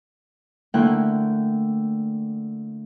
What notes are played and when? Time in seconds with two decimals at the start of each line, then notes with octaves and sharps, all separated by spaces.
0.74 D3 A3 A#3 E4 G5 F#6